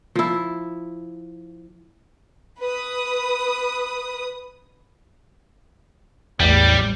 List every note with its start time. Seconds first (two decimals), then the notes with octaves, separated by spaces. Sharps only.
0.15 F3 E4
2.60 B4 D#6
6.40 A1 E2 G3